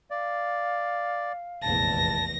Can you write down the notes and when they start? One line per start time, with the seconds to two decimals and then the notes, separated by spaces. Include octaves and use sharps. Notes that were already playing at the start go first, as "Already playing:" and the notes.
0.10 D5 F5
1.63 F1 A#1 E2 A5 A#6